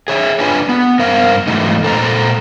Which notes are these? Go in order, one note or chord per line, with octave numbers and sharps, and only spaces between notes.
G#4 C#5 E5
D4 F4 B4 D5 G#5
B3
G2 A#4 C5 F5
G#2 E3 F#3 A3 D#4
A#2 A4 C5 G#5 A#5